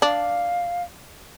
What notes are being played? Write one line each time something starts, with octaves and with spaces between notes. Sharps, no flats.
D4 F5